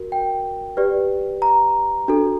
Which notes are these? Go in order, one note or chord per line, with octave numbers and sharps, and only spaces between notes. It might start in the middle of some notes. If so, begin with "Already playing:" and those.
Already playing: F#4 A#4
G5
G4 B4 D5
A#5
D4 F#4 A4